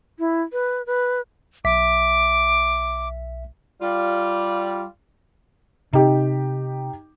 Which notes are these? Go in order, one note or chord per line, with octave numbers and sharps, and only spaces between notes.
E4
B4
B4
B1 E5 D6 B6
G3 F4
C3 D#4 G4